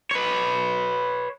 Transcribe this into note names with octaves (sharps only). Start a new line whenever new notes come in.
B4 C#5